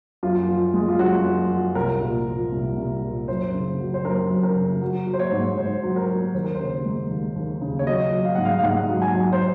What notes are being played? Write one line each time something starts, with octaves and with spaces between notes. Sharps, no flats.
F#2 F4
F3
G#3
F4
F#2 F#4
F#2
F3
C2 A#4
A#2
F3
C2
C2
A#2
F#2 C5
C#3
F#3
C5
F#2 A#4
F#2
A#4
C#3
F#3
F#3
C5
C#5
G#2
G#2 C5
F#3
A#4
F#3
D#2 C5
A#4
C5
C#3
G#3
D#2
D#2
C#3
C#5
F#3 D#5
F#3
F5
G#2 F#5
F5
F5
G#2 F#5
F#3
G#5
F#3
C5